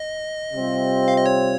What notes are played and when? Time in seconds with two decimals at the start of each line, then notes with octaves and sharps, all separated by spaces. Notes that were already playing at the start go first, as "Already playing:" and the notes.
Already playing: D#5
0.53 C3 G3 C4 F4
1.08 F5
1.17 D#5
1.26 C#5